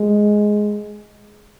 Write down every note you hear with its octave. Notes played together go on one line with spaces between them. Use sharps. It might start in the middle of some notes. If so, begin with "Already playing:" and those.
Already playing: G#3